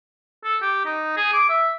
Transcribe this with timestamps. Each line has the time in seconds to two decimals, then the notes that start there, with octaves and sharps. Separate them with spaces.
0.44 A4
0.62 G4
0.85 D#4
1.17 G#4
1.33 D6
1.49 E5